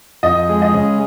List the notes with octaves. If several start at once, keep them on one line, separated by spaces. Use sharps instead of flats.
F2 D#5
G#3
D#5
C#3